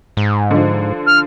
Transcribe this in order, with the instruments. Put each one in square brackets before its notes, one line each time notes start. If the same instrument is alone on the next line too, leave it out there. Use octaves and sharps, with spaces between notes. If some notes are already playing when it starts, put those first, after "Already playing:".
[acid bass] G#2
[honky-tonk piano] D3 F3
[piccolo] F6